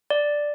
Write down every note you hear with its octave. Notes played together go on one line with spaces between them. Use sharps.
D5